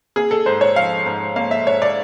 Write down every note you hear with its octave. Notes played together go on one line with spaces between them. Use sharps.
A#3 G#4
A4
G#2 C5
C#5
F3 F5
G#2
A#3 F5
E5
G#2 C#5
D5